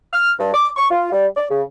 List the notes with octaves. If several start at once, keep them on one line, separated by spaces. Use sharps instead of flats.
F6
G2
D6
C#6
F4
G3
D5
C#3